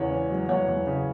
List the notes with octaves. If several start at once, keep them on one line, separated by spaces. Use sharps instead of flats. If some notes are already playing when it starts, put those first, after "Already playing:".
Already playing: E2 C#3 C#5 F#5
C#4
F#3
E2 C#5 F#5
E2
C#3